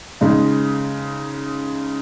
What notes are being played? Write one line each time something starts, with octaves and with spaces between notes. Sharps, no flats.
C#3 G#3 D#4